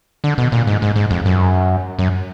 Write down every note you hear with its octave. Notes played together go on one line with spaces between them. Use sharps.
D3
B2
A#2
G#2
G#2
G#2
F2
F#2
F#2